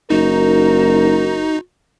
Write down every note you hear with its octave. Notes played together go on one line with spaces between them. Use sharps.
F#1 D#4 F#4 A#4